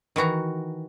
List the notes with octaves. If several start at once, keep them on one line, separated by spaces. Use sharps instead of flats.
D#3 E3 F#4 A#5